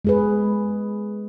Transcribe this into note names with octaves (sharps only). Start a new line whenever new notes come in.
G#3 G#4 B4